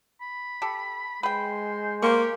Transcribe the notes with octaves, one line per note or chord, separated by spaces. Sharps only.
B5
G4 A4
G#3 B4 C5 G5
A#3 G4 C5 C6 C#6